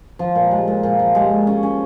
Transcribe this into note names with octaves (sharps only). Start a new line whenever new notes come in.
F3
A#2
G#3
A#2
A#2
F3
G#3
A#2
C#4
C#4